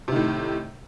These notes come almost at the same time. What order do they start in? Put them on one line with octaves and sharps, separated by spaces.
C3 D#3 A2